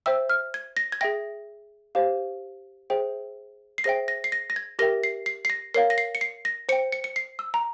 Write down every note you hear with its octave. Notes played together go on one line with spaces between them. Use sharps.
C5 E5 G5 E6
F6
G#6
A#6
G#6
G#4 E5 G5 A#6
G4 C5 F5
G#4 C5 E5 G5
C7
G#4 C5 E5 G5 A#6
A#6
C7
A#6
A#6
G#6
G4 A#4 E5 G5 A#6
C7
C7
C7
A#6
A#4 C#5 F5 C7
A#6
C7
C#7
C7
A#6
C5 G5 C#7
C#7
C#7
C7
E6
A#5